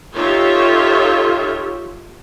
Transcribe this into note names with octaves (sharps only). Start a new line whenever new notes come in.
D#4 F4 G4 A4 C#5 E5